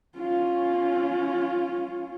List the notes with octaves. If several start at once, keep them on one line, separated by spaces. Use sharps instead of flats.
C#4 F4